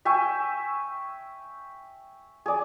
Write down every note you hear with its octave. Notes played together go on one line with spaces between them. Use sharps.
E5 G5 G#5 C#6
G#4 D5